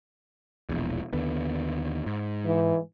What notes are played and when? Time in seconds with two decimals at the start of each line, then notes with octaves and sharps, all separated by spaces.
0.69 E1 A#1 E2
1.13 D#2 D3 B3
2.06 G#2
2.45 E3